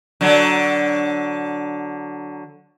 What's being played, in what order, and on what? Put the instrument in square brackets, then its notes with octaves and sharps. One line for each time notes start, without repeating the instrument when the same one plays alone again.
[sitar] D3 F#3